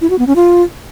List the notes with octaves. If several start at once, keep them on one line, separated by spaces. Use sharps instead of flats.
E4
F#4
B3
C#4
F4